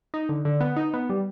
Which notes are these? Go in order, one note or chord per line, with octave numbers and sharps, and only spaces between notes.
D#4
D3
D3
B3
D#4
B3
G3